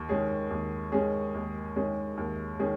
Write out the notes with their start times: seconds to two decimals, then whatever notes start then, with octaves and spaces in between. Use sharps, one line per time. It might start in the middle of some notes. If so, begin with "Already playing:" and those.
Already playing: D#2
0.09 D#3 G#3 C#4 G#4
0.51 D#2
0.92 D#3 G#3 C#4 G#4
1.34 D#2
1.76 D#3 G#3 C#4 G#4
2.17 D#2
2.59 D#3 G#3 C#4 G#4